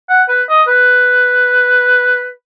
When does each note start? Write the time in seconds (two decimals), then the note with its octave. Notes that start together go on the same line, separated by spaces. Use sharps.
0.09 F#5
0.29 B4
0.49 D#5
0.68 B4